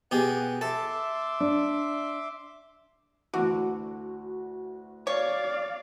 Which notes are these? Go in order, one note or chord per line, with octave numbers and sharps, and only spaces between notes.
B2 G4 G#4 F#5
A4 E5 C6 D6
D4
D2 D3 E3 F#4
C#5 D5 F5